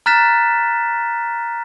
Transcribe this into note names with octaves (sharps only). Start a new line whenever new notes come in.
A#5 F6 F#6 A6 B6 E7